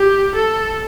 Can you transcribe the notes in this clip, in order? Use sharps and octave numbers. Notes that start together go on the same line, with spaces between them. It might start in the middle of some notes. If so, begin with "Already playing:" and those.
Already playing: G4
A4